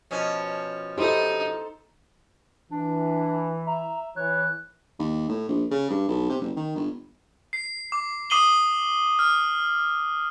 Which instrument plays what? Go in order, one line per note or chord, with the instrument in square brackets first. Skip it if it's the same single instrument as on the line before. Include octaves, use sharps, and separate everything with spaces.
[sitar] B2 F3 C#4
[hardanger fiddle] D#4 [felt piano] E4 G4 [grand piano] A4 C5
[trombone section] E3 [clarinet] D4
[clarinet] E5 [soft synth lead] A#5
[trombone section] E3 [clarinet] C#5 [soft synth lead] F#6
[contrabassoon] D#2
A2
A#1
C#3
G2
B1
C3
F#1
D#3
G1
[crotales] C7
D6
D6 D#6 C7 D#7 F#7 G7
F6